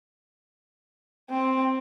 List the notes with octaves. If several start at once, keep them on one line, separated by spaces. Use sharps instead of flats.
C4